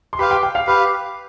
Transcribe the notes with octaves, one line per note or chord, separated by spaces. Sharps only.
C6
G4 B4 F5 B5
G5
G5
F5
G4 B4 F5 B5